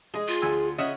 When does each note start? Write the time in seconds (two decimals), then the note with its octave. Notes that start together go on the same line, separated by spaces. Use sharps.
0.14 G#3 G#4 D#5
0.28 F4
0.42 D2 G#5 E6
0.78 C#3 C#5 D#5 E5 F#5